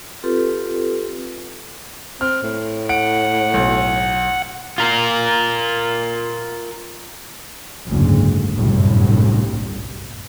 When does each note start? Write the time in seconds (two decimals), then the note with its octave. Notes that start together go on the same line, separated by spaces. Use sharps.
0.24 C4 F4 G4 A4 B4
2.21 C4 F6
2.43 A2
2.89 F#5 D7
3.54 B1
4.78 F4 A#4
7.88 F#1 D2 G#2
8.56 G1 C2 F#2 A2